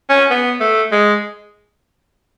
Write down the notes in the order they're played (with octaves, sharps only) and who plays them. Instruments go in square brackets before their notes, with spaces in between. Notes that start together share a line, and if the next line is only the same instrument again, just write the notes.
[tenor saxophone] C#4
B3
A3
G#3